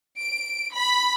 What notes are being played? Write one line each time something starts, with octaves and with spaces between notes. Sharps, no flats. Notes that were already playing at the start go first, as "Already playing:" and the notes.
D7
B5